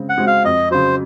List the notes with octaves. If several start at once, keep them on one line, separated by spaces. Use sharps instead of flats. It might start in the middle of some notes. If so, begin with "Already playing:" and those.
Already playing: C#3 G#3 C4
F#5
G#3 C4 F#4
F5
F2 D#5
C#3 F#3 C5